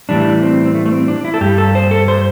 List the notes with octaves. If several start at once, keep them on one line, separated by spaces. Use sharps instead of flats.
A2 E3 G3 D4
C4
C4
A3
A3
C4
D4
E4
A4
G2 G3 G4
A4
C5
A4
C5